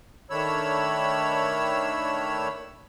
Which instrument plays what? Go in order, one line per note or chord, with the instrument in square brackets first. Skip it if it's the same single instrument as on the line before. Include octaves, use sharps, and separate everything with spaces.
[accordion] D#3 A3 D4 C#5 B5 E6